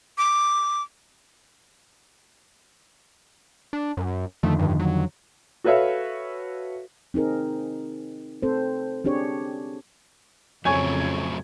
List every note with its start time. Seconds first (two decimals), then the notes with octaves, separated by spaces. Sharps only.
0.18 D6
3.73 D4
3.97 F#2
4.43 F2 D3 D#3 A3
4.59 G2
4.80 F#3
5.64 F#4 A4 B4 C#5 E5 F5
7.14 C4 D#4 G#4 A#4
8.42 C4 A4 C5
9.04 C4 D4 G4 G#4 C#5
10.65 F2 C#3 F#3 A3 C4 C#5 G#5 G#6